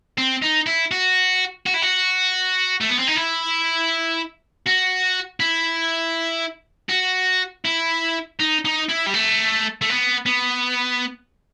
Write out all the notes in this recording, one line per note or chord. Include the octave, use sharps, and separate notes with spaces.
C4
D#4
E4
F#4
F#4
E4
F#4
A3
B3
C4
D#4
E4
F#4
E4
F#4
E4
D#4
D#4
E4
G3
A3
A3
B3
B3